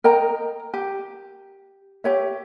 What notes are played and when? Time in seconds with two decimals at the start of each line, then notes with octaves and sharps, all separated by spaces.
0.04 A#4 D#5 G5 A#5
0.74 G4
2.04 G4 C#5 E5